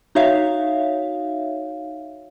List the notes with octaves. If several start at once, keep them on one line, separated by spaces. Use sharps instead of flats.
D#4 F#4 C#5 E5 F5